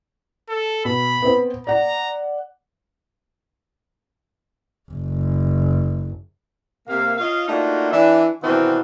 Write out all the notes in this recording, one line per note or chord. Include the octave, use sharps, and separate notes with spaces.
A4
B2 B5
B3 C4
D5 F#5 A#5
F#1
C3 A#3 F5
F4 C#5 D#5 F5
A3 A#3 D4 D#4 F4 F#4
E3 D4 E5
B2 D#3 E3 C4 D4 F#4